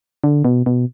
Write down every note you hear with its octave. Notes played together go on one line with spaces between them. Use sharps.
D3
B2
B2